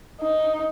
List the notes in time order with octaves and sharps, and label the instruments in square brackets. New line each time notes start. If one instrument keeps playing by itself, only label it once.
[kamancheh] D#4